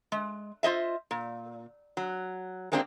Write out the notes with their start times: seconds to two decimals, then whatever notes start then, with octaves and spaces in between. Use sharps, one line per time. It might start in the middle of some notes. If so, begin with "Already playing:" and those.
0.12 G#3
0.63 F4 C5 D#5 E5
1.11 A#2
1.97 F#3
2.72 G#3 A#3 C4 D4 E4 G4